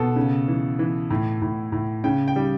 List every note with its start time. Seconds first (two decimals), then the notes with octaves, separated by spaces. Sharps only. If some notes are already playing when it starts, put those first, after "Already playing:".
Already playing: B2 A4
0.16 C#3
0.48 E3
0.79 E3
1.10 A2
1.42 A2
1.72 A2
2.04 C#3 G5
2.28 G5
2.36 G3